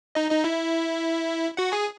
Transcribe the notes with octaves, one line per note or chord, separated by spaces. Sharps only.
D#4 D#5
D#4 D#5
E4 E5
F#4 F#5
G#4 G#5